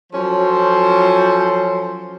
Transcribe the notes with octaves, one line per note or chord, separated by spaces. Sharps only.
F3 F#3 C#4 A4 C5